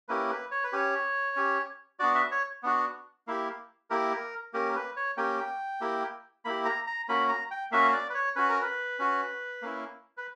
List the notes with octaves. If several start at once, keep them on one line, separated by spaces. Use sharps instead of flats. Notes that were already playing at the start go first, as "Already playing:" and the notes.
A#3 C#4 E4 G4 B4
B4
C#5
B4
C#4 G4 C#5
C#4 G4
B3 D4 F#4 D5
E5
C#5
B3 D4 F#4
A#3 E4 G4
A#3 E4 G4 A#4
A#3 C#4 G4 A#4
B4
C#5
A#3 C#4 G4 G5
A#3 E4 G4
A#3 E4 G4 B5
A#5
A#5
A#3 C#4 F#4 B5
A#5
G5
A#3 C#4 F#4 E5
D5
B4
C#5
C#4 F#4 B4
A#4
B4
C#4 F#4
A#3 C#4 E4
B4